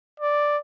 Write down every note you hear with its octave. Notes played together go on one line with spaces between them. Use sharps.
D5